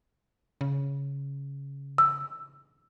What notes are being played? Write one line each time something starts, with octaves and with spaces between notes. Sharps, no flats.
C#3
E6